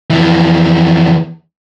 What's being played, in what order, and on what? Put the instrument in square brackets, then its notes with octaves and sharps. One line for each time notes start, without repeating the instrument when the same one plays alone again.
[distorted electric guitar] F2 E3